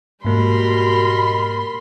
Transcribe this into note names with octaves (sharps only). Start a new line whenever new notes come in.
G#2 B2 G3 A#3 A#4 B5 C6